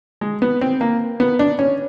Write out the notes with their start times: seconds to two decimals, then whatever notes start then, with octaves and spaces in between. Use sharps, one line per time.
0.21 G#3
0.42 B3
0.61 C4
0.81 A#3
1.20 B3
1.39 D4
1.59 C#4